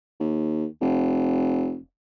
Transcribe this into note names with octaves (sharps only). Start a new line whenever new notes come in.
D#2
F1